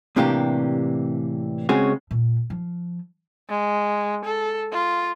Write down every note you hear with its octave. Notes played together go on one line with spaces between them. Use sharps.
A2 C3 E3 A#3 D4 G4
C#3 G#3 C4 C#4 F#4
A#2
F3
G#3
A4
F4